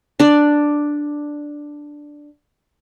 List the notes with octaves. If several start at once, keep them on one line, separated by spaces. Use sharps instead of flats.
D4 D5